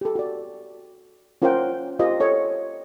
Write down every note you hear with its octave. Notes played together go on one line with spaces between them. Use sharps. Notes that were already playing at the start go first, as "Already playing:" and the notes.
G4 A4
F#4 D5
C#4 F4 A#4 C5 F#5 G5
F4 G4 A#4 C5 D#5
A4 C#5 D#5